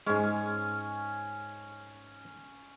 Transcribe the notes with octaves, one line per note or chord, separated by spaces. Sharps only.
G#2 G#3 C#4